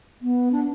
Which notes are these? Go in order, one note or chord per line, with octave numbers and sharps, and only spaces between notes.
B3
D4